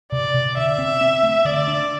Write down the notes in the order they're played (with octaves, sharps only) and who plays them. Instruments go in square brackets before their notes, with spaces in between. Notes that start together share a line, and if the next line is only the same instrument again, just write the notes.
[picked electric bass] C3 [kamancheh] D5
[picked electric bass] C3
[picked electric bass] D3 [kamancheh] E5
[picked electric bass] C4
C4
A3
[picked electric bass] D3 [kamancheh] D5
[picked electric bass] D4